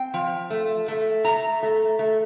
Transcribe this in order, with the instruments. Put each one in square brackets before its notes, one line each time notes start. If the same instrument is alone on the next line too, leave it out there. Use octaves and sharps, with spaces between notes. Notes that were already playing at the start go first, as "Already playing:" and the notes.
Already playing: [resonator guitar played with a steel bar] C4 G5
F3
A3
A3
A3 A#5
A3
A3